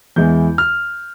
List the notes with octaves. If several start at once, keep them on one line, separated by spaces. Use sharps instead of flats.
E2 E3 G#3 E4 G6
F6